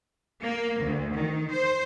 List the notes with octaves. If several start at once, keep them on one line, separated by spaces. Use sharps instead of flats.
A#3
D2
D#3
C5